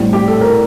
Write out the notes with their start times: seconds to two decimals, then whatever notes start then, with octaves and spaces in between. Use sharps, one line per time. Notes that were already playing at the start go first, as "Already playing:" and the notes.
Already playing: A2 G3 C4
0.13 G4
0.28 A4
0.41 A#4